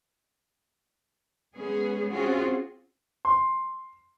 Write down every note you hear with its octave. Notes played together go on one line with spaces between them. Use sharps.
G#3 B3 C#4 G#4
C4 C#4 F4 F#4 G#4
C6